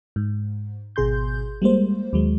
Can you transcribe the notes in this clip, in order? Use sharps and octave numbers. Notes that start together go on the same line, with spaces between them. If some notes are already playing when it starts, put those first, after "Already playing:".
G#2
G#1 B2 G#4 C6 G6
G3 G#3 A#3 C5
D#2 F#3 G#3